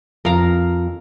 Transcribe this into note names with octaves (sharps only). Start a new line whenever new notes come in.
F2 A#4 F5 A#5